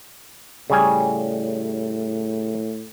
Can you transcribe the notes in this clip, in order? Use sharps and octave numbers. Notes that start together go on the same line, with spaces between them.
A2 C#3 G3 G#5